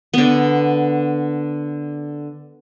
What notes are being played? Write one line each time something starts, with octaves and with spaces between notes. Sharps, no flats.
D3 B3